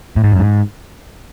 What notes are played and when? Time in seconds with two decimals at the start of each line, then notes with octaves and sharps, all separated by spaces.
0.16 A2
0.24 G#2
0.32 F#2
0.39 G#2